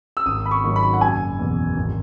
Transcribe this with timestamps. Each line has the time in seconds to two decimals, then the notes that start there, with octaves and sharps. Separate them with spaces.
0.17 E6
0.26 G#1 D#6
0.46 B5
0.51 C#6
0.63 G#2 D#3 F#3
0.76 B5
0.93 F#5
1.01 F#1 G#5
1.39 E2 B2
1.77 G#1